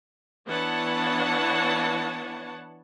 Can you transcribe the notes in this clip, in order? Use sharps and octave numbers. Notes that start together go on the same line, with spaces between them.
E3 B3 D4 C#5 F#5 A5